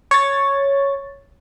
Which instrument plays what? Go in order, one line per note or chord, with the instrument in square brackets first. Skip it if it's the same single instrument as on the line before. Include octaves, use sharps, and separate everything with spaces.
[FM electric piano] C#5 A6